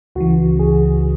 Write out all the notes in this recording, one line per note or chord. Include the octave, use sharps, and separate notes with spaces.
C#2 C#3 E3 F#4
G#4